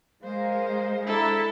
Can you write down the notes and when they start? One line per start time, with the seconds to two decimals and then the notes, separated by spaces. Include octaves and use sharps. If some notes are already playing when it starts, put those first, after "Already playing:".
0.24 G#3 A#4 C5 F5
1.06 D4 E4 A4 A#5